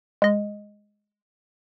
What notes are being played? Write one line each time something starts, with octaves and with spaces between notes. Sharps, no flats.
G#3 D#5